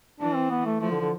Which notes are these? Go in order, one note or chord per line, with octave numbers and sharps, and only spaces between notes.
E3 D4
C4
B3
A3
F3 A3
D3
D3